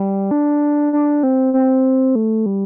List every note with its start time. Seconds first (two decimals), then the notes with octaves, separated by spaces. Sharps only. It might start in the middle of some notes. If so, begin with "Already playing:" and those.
Already playing: G3
0.31 D4
0.93 D4
1.23 C4
1.54 C4
2.15 A3
2.46 G3